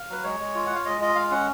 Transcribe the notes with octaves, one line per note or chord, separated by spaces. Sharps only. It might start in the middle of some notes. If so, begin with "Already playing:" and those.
Already playing: F5
F#3 B4
G#3 C#5
G#3
F4
F4 F#5
F5
G#3 D#5
F4 D#5
G#3 F5
C#4 F#5